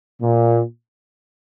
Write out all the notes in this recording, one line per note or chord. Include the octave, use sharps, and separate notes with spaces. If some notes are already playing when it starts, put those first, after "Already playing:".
A#2